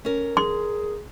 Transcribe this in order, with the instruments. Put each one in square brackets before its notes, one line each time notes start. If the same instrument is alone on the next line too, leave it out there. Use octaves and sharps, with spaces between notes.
[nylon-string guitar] C#4 A#4
[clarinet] G#4 [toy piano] C6